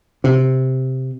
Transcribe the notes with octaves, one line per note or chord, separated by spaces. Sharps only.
C3